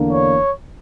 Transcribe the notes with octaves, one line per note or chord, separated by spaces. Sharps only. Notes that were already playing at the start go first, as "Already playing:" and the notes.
Already playing: E2 D3 A#3 D4
C#5